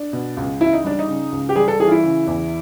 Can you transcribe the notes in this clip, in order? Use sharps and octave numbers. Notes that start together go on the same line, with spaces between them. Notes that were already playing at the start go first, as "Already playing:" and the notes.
Already playing: D4
B2
C#2
C#2 E4
D#4
G3 D4
D#4
C#3
C#2
G4
G3 G#4
A4
E3 G#4
F4
E4
C#3
E2